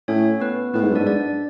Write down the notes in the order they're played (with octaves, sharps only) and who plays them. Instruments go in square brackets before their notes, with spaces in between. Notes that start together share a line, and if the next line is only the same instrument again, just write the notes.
[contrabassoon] A2 [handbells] C#4 C#5
[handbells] B3 B4
[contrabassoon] A2 [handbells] B3 B4
[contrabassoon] G#2
F#2
[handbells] D4 D5
[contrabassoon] G#2
[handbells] D4 D5